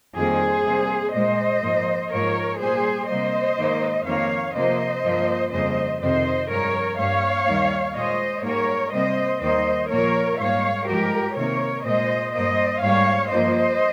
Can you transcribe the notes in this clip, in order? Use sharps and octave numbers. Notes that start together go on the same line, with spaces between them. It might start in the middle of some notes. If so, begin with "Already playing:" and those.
F2 D#3 G3 A#3 G#4 C5
C3 G3 A#3
A#2 G#3 C5 D#5
G#2 F3 A#3
G#2 F3 A#3 A#4 C#5
A#2 G3 A#3 G#4 C5
C3 G3 A#3 C5 D#5
G#2 D#3 A#3
F2 D#3 A#3 C#5 F5
C3 F3 A#3 C5 D#5
G2 F3 A#3
F2 C#3 G3 A#3 C5 D#5
F2 C3 D#3 C5 D#5
G2 F3 G#3 A#4 C#5
G2 G3 A#3 C#5 F5
D#2 D#3 G3 A#3
A#2 G#3 C5 D#5
G#2 G3 A#3 A#4 C#5
C3 G3 A#3 C5 D#5
D#2 D#3 G3 A#3 C5 D#5
A#2 F3 A#3 A#4 C#5
G#2 G3 A#3 C#5 F5
G2 F3 G#3 G4 A#4
C3 D#3 A#3 A#4 C#5
A#2 G#3 C5 D#5
G2 G3 A#3 C5 D#5
G#2 G3 A#3 C#5 F5
G2 F3 A#3 C5 D#5